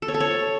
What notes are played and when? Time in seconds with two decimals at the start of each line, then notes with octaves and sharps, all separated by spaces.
0.02 A4
0.08 C#5
0.14 A4
0.20 C#5